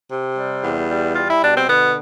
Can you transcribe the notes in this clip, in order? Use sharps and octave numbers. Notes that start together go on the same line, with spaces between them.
C3
G3
E2
G3
G3 F4
E4
B2 D4
C4
D3 B3